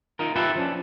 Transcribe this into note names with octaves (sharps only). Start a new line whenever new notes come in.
D#4 F4 A#4
E4 F4 G4 A4 B4 E5
F3 C#4 D4